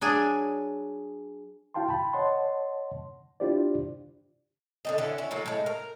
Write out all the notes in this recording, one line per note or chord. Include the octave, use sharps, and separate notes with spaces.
F#3 D4 G#4
E4 F#4 F5 G5 A5 C6
G5 A5 B5
C#5 D#5 F#5 A5 C6
D4 E4 F4 G4 C5 D5
D3 C4 D#5
D3 E3 C#4
C#4 E4
A2 F#3 A#3
A2 G#3
A#4